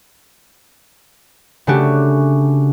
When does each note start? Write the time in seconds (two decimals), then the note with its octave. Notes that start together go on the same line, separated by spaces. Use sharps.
1.67 C#3 A3 D4 F#4 G4